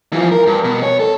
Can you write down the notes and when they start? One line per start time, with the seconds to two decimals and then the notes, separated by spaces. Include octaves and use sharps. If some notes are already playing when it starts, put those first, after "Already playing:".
0.13 E3 F3
0.31 A#4
0.47 G2
0.64 B2
0.82 C#5
1.00 A4